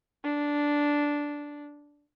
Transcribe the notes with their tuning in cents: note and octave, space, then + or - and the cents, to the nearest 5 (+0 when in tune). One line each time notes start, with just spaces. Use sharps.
D4 -5